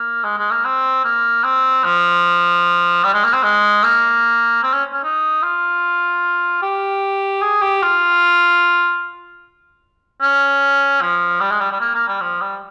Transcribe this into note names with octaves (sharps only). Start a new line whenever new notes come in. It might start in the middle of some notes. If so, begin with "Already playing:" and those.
Already playing: A#3
G#3
G#3
A#3
C4
A#3
C4
F3
G3
G#3
A#3
C4
G#3
A#3
C4
C#4
C#4
D#4
F4
G4
G#4
G4
F4
C#4
F3
G3
G#3
G3
G3
A#3
A#3
G3
F3
G3